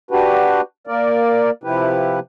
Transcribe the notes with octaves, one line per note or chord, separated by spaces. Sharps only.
D4 F#4 G4 B4
A#3 A#4 D5
C3 F3 E4 G4 B4